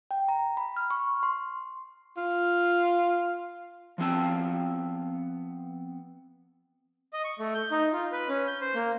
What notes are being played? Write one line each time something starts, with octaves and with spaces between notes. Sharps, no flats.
G5
A#5
B5
F6
C#6
C6
F4
F3 B3 C4 A5
D#5
C#6
A3
G6
D#4
F4
B4
C#4
G6
C5
A#3